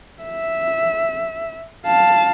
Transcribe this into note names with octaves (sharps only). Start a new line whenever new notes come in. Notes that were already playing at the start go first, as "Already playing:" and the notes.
E5
F5 A5